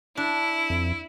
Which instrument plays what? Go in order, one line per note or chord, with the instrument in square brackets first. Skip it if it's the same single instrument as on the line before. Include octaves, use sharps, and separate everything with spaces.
[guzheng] D4 [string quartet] E4
[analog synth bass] F2